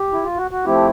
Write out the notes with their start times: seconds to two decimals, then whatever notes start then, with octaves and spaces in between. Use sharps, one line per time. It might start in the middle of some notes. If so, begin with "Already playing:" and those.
Already playing: G4
0.12 E4
0.24 F4
0.37 F#4
0.51 F#4
0.65 F3 A3 C4 E4 G4